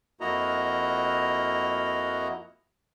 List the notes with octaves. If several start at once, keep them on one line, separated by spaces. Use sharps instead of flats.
F2 A#3 E4 F#4 D#5 A#5